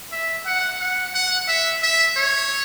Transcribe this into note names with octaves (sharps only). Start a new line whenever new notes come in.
E5
F#5
F#5
F#5
E5
E5
C#5